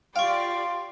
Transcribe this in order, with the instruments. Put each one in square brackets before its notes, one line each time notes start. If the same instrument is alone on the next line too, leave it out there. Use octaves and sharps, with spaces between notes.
[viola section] F4 G4 D5 [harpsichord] F5 [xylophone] G5 C#6 [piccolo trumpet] C6